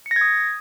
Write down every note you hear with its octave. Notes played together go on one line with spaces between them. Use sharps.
C#7
A#6
G#6
D#6